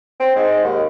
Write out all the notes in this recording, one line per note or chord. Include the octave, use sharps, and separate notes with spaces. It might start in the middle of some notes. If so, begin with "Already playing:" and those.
C4
G#2
D#2